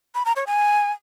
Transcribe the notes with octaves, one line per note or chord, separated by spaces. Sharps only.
B5
A#5
C#5
G#5